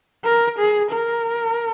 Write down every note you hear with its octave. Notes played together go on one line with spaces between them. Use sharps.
A#4
G#4
A#4